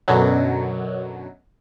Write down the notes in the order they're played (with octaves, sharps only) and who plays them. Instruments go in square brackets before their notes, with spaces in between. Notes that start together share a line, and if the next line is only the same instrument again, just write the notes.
[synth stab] F#2 B2 D3 F#3